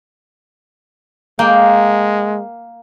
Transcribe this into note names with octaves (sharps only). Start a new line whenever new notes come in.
G#3 A#3 G5